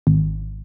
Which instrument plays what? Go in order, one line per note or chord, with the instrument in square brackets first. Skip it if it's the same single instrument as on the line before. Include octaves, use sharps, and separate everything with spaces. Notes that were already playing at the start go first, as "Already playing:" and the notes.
[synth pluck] G#1